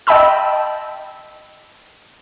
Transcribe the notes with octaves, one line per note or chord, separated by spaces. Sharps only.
D#5 G5 A5 B5 E6